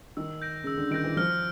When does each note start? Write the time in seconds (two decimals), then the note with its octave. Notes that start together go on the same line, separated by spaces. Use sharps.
0.17 D#3 E6
0.42 G6 A#6 D7
0.64 C#3 E6
0.77 D3
0.91 D#3 G6 A#6 D7
1.04 E3
1.17 F3 F6